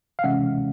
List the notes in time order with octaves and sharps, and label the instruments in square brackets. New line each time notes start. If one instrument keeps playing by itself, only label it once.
[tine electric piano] F5
C3 E3 G#3 C#4 E5 F#5